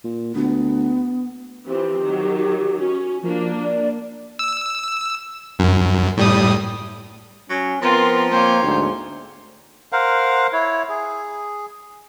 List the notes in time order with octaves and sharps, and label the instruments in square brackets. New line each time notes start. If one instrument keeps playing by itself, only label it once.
[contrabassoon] A#2
[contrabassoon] D2 [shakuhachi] B3
[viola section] E3 F3 C4 [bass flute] G4
[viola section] D#3 F#3
[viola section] C#4 [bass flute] F#4
[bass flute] F3 [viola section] A#3 D4
[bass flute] D5
[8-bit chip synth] E6
F#2
A2 G3 D#6
[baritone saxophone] F#3 [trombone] C#4
[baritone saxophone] F3 [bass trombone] B3 [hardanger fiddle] C4 F4 [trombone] A#4
[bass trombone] A#3 [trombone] C4 [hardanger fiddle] C5 C#5
[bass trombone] D2 [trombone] G#2
[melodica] A#4 C5 F5 F#5
E4 C#5
G#4